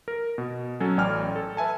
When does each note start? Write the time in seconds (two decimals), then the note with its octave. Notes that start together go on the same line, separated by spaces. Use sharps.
0.08 A#4
0.38 B2
0.80 F#3 C#4 A4
0.97 A1 D5 G5 G#5 F6
1.36 A4
1.57 B4 E5 G#5 A5